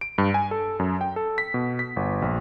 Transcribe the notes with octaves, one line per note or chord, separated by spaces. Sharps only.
D7
G2
G#5
A4
F#2
G5
A4
B6
B2
B6
G1
A#1